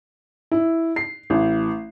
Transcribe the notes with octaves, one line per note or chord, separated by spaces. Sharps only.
E4
C7
A1